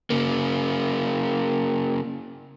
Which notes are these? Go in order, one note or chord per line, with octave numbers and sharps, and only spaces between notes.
C#3 A#3